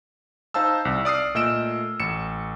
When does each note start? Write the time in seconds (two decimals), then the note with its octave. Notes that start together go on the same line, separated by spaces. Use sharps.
0.54 D#4 C5 F5 A5 E6
0.85 C2
1.05 D5 D#6 F6 C7
1.35 A#2 A3 D#5 E6 D7 E7
2.00 A1 C#7 E7